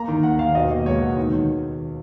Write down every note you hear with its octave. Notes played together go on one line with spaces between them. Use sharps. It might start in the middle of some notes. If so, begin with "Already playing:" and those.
Already playing: A#3 A#5
D#3
D#2 F#5
D#2 F5
B2 D#5
A#3
C#2 C#5
B2 F#5
D#3
D#3